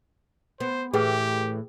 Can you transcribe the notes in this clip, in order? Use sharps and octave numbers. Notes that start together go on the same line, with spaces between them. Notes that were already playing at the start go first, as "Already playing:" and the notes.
B3 C5
A2 E3 G4 G#4 B4 G5